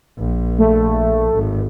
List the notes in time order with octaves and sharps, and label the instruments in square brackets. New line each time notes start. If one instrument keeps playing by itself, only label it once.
[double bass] A#1
[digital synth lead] A3
[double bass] G#1